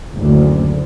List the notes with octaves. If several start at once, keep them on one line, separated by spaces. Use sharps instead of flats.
F#1 D2